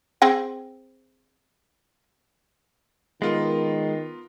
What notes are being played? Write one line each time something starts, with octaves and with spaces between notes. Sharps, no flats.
C4 G#4 G5
D#3 G#3 B3 F4 A#4